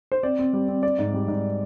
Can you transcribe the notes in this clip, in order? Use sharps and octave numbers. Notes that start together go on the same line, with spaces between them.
C5
C4 D5
C4
G3
C4
C4 D5
G#2
G3
G#2